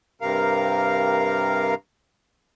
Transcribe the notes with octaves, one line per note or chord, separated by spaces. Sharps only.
G2 C3 A#4 F5